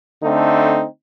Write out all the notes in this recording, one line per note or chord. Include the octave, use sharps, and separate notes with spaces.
D3 A3 C4 D#4